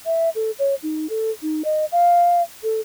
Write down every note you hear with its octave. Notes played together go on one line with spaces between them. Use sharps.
E5
A4
C#5
D#4
A4
D#4
D#5
F5
A4